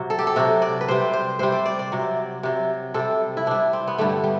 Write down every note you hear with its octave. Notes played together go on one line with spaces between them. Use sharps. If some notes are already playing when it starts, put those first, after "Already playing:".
Already playing: C3 F#3
A4
G4
A4
C3 F#3 F#4
D5
B4
C3 G3 C5
C5
C3 G3 C5
D5
D5
D5
C3 F#3
C3 F#3
C3 G3 A4
E4
C3 G3 D4
C4
B3
G2 D3 G3 A3
G3